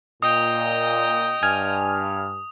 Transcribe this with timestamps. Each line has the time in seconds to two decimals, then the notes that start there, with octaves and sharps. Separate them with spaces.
0.22 A#2 D#5 G5 D#6
1.43 G2 G#5 F6